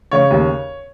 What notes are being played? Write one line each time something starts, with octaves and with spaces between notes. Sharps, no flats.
C#3 C#5
D#2